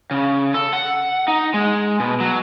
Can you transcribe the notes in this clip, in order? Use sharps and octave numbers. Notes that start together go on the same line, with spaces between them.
C#3
A4
F#5
D#4
G#3
B2
F#3